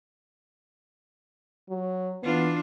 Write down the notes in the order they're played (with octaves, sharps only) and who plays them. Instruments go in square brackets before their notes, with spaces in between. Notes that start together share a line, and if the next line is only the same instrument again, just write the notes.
[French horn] F#3
[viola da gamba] E3 D4 F4 [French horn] B3